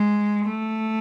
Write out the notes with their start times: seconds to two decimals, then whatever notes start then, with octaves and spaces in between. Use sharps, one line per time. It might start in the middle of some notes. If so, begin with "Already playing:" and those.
Already playing: G#3
0.47 A3